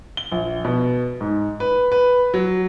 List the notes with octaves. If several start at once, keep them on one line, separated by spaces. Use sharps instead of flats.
G7
A#1
B2
G#2
B4
B4
F#3